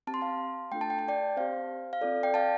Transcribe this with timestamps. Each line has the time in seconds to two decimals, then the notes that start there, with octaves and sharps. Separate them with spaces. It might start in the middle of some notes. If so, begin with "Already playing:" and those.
0.07 C4 G4 A5
0.14 C6
0.21 F5 A5
0.71 A3 D4 F4 A4 G5
0.81 A5
0.90 G5
0.99 A5
1.08 D5 G5
1.37 C4 G4 C5 F5
1.93 F5
2.01 C4 F4 A4 D5
2.23 D5 G5
2.34 F5 A5